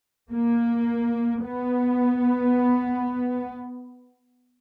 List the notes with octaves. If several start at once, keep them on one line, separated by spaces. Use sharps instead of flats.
A#3
B3